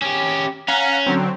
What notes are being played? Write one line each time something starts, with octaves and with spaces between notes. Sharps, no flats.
C#4 G4
C#4 F5 F#5 A#5
D3 F#3 C4